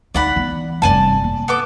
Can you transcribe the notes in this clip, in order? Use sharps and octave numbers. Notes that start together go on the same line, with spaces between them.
D2 D#4 D5 F#5 B5
E3 B3
F1 G2 D5 G#5 A5
A#3
B3 A4 D6